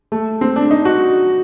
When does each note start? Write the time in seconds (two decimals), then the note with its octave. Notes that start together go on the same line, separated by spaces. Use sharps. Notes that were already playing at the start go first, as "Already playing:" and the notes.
0.12 A3
0.41 C4
0.56 D4
0.71 D#4
0.85 F#4